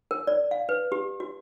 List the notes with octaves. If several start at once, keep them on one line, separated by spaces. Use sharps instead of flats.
A#4
D5
F5
B4
G4
F#4